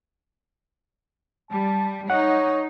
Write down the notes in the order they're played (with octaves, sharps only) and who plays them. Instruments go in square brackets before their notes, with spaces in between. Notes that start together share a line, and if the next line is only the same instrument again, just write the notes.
[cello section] G3 [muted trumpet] A5
[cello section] D#4 [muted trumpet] C#5 [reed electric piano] F#5